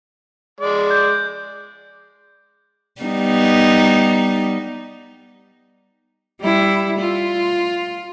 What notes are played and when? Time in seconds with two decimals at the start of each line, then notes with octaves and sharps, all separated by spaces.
0.60 G#3 D5
0.91 G6
3.02 G3 B3 D#4
6.41 G3 E4
6.99 F4